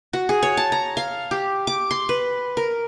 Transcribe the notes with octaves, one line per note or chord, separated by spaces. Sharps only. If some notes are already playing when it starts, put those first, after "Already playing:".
F#4
G#4
C#5
A5
A#5
F5
G4
D6
C6
B4
A#4